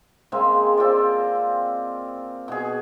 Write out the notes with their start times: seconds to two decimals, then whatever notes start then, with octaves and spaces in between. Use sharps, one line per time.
0.32 C#3 G#3 A#3 C4
0.77 C4 F4 D5
2.48 B2 G#4